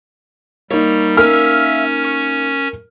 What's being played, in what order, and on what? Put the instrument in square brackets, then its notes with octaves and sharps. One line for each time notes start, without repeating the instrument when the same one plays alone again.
[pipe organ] G3 [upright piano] A#3 D#4 [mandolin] C#5
[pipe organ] C#4 [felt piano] A#4 F6 [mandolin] E5 F5
[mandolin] C#6